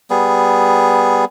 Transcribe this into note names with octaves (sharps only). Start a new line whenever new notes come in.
G3 B3 G#4